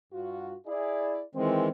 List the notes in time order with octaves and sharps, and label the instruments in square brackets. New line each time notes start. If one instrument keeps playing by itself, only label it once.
[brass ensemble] G2 F4 F#4
E4 G#4 D5
[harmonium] D#3 E3 G#3 [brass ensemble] C4